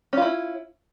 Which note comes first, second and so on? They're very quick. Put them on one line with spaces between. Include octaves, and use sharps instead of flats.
C#4 F4 E4